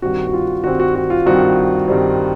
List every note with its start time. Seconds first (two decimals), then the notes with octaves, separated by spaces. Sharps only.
0.02 G2 D#3 G3 C4 F#4
0.27 F#4
0.33 F4
0.64 G2 D#3 G3 C4 F#4
0.80 F#4
0.95 F#4
1.10 F4
1.26 G2 D#3 G3 C4 F#4
1.88 G2 D#3 G3 C4